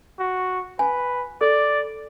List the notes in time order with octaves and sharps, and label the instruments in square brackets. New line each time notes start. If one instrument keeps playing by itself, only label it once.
[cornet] F#4
[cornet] B4 [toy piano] G#5
[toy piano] A4 [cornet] D5